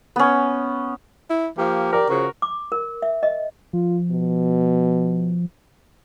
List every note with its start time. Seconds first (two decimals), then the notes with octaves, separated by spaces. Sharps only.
0.16 B3 C#4
1.30 E4
1.58 F3 A#3 G4
1.93 A#4 D5
2.10 C#3 F3 F#4
2.42 D6
2.72 A#4
3.02 E5
3.23 D#5
3.73 F3 F4
4.11 B2